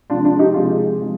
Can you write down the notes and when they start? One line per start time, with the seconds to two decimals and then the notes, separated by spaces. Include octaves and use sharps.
0.09 C3 F3 G#3 D4 F4
0.25 D4 F4
0.39 D#4 G4
0.54 C3 F3 G#3 F4 G#4
1.00 F3 G#3